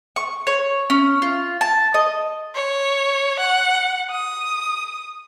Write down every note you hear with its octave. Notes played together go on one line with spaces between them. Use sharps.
C#6
C#5
C#4
F4
A5
D#5
C#5
F#5
D#6